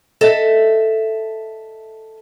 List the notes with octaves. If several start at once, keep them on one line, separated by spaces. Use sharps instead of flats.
A4 D#5 E5